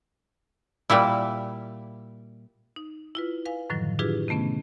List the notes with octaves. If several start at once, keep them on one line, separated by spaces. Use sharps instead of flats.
A#2 G3 A#3 E4
D#4
E4 F4 B4
B4 F5 G#5
F#2 A2 D3 D#3 F3 F#3
D4 E4 F4 G4 G#4 B4
C3 D#3 A3 B3 C#4